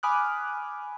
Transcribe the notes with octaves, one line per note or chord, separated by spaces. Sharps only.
G#5 B5 D6 D#6 F6 F#6